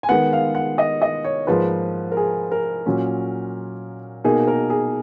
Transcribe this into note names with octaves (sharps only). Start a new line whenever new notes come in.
G#5
D#3 G#3 B3 F#5
F5
F#5
D#5
D#5
C#5
G#2 F3 A#3 B4
A#4
G#4
A#4
A#2 F#3 C#4
B2 A#3 D#4 G#4
A#4
G#4